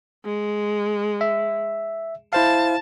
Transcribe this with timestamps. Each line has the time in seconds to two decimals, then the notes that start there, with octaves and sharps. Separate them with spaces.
0.25 G#3
1.21 E5
2.33 E4 C5 F5 A5